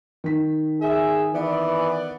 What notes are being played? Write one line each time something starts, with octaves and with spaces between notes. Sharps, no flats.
D#3 B6
G#4 E5
E3 B3 D5